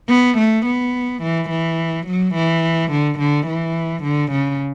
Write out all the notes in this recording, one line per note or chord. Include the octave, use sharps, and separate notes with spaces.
B3
A3
B3
E3
E3
F#3
E3
D3
D3
E3
D3
C#3